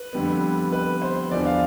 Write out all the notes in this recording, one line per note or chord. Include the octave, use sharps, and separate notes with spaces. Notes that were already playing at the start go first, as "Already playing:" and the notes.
Already playing: B4
F2 D3 G3 B3
B4
C5
E2 D3 F3 B3 D5
F5